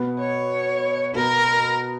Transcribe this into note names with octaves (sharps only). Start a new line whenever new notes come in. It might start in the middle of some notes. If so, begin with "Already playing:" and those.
Already playing: B2 B3
C#5
B2 B3 A#4